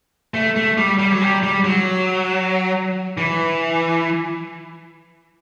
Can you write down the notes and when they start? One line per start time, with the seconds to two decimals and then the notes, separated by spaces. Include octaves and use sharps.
0.34 A3
0.56 A3
0.78 G3
0.99 G3
1.12 F#3
1.21 G3
1.43 G3
1.65 F#3
3.17 E3